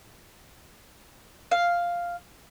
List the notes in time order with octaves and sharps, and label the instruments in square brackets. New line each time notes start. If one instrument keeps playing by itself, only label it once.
[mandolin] F5